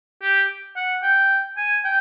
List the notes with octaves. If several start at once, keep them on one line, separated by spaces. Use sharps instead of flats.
G4
F#5
G5
G#5
G5